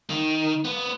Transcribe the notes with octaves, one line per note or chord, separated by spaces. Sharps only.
D#3
B3